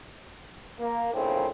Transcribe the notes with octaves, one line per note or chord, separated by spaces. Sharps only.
A#3
A#1 A2 C#3 C4